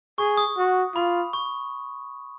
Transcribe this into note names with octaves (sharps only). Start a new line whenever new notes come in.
G#4 C#6
D#6
F#4
F4 B5
C#6